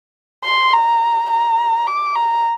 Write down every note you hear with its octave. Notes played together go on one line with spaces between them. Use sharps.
C6
A#5
A#5
D6
A#5